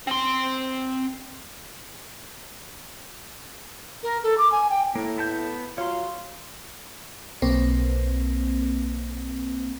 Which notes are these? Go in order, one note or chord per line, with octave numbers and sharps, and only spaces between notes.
C4 C6
A#4
A4
D6
G#5
G5
A2 A#3
B3 A5 G6
F#3 F4 C#5 C6
B1 A#3 C4